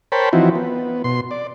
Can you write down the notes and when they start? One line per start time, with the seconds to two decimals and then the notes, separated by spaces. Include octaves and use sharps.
0.12 A#4 C5 C#5 G5 A5 B5
0.33 E3 F3 C4 D#4 E4 F#4
0.55 B3
1.04 B2 C6
1.31 D5